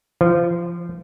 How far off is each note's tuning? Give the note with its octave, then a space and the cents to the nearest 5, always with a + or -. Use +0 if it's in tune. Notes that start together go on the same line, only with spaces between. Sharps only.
F3 -25